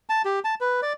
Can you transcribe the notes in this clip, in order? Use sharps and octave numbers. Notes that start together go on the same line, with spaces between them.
A5
G4
A5
B4
D5